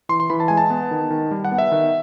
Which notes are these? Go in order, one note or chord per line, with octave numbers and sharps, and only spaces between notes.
E3 C6
C6
E3 B5
A5
G#3 G#5
A5
B3
D#3
D#3
G3
F#5
B3
E5
D#3